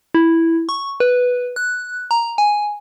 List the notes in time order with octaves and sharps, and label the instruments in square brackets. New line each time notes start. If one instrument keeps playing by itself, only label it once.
[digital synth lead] E4
C#6
B4
F#6
A#5
G#5